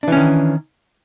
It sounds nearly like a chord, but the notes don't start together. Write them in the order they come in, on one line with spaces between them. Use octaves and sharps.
D4 E3 C#4 D#3